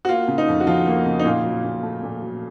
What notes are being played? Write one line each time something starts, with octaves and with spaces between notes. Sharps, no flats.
F#4
A#3 F4
C#3
D#4
F2
F#4
F3 F4
A#3
C#3
D#4
A#2 F4
F#3
A#2
A3
A#2
F#3